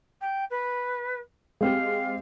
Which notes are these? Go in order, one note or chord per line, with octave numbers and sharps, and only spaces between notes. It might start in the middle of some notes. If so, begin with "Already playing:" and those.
G5
B4
G#3 C4 G4 F5